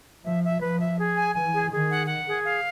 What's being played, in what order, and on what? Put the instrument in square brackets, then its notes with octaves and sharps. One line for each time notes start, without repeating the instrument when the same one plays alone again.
[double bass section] F3 [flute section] E5
[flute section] E5
[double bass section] F3 [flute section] B4
[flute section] E5
G#4
G#5
[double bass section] E3 [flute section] G#5
[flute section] G#4
[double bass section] D#3 [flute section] G#4
[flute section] F#5
F#5
G#4
F5